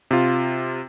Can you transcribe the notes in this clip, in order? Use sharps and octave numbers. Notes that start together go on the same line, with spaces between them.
C3 F4